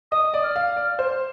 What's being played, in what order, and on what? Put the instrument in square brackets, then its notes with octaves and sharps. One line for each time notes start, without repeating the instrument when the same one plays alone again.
[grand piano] D#5 [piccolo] D#6
[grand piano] D5
[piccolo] F6
[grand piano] F5
D5
C5